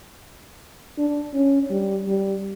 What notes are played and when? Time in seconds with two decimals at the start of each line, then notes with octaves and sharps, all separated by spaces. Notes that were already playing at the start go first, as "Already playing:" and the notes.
0.98 D4
1.34 C#4
1.71 G3
2.08 G3